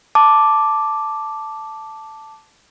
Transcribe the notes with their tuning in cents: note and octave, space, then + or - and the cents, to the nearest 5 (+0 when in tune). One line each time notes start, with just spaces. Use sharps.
A5 +0 D6 +0